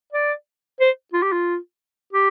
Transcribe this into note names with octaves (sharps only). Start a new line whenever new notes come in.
D5
C5
F4
G4
F4
G4